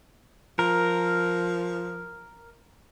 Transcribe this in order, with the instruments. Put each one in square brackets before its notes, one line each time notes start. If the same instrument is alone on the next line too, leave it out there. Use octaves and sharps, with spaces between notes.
[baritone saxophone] F3 [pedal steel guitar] A#4